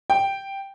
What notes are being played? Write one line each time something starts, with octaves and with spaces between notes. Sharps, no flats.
G5